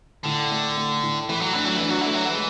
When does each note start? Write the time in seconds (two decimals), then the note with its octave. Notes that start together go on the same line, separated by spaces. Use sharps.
0.25 A2 D3
0.51 A3
0.77 A3
1.03 A2
1.29 E3 A3
1.41 F#3
1.53 E3 D4
1.65 F#3
1.77 E3 D4
1.89 F#3
2.01 E3
2.07 A3
2.14 F#3
2.25 E3
2.33 G#3